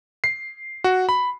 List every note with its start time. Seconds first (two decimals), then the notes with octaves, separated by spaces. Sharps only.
0.24 C7
0.84 F#4
1.09 B5